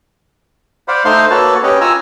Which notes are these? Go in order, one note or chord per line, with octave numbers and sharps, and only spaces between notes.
C5 D5 F5 F#5 B5
A3 D#4 C5 F5 C6 F6
A#3 F#4 A4 B4 C#5 A5
C#4 G4 B4 C#5 D#5
F4 G#5 A#5 E6